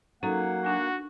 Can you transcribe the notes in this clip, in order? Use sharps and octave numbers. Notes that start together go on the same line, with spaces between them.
F#3 A#3 C#4 D#4 A4 F#5
D4 F#4 G#5